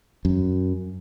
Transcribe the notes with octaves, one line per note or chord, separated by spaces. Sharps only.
F#2